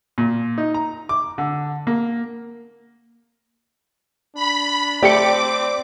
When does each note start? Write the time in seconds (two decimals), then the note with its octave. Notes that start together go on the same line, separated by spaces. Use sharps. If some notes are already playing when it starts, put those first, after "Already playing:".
0.18 A#2
0.58 D#4
0.74 A#5
1.09 D6
1.38 D3
1.87 A#3
4.35 D4 B5
5.02 A3 C4 G4 D5 G5 D6 C#7